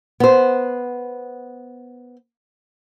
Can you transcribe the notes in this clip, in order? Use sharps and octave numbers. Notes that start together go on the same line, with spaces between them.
B3 C5